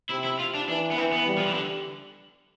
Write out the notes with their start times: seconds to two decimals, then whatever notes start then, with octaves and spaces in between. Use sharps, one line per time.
0.10 C3 E4
0.25 E4
0.39 F4
0.55 D4
0.69 E3 D4
0.91 B3
0.98 E3 C4
1.12 B3
1.27 G3
1.38 F3
1.46 E3
1.55 D3